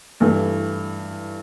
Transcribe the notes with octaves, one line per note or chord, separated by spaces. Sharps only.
G2 E3 A3